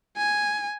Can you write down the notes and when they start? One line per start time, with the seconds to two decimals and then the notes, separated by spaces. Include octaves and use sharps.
0.17 G#5